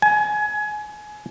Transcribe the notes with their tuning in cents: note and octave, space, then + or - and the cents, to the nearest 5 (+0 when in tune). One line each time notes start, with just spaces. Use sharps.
G#5 +25